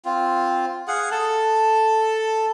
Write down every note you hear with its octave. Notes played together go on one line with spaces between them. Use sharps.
C4 F4
G#4 F5 F#5
A4 A5